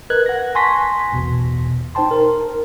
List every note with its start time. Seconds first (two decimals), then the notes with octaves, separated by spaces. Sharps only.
0.10 A#4 B4 D#5 F#6 G#6
0.26 F#5 A#6
0.55 G#5 A5 C6 C#6 A#6 B6
1.12 A1 E2 B2
1.95 D#4 C5 G5 A5 C6
2.11 A#4